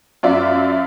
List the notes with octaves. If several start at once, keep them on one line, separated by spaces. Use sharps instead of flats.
F#2 F4 D5 E5